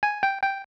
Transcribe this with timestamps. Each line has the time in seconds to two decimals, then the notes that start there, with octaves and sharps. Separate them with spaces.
0.03 G#5
0.23 G5
0.42 G5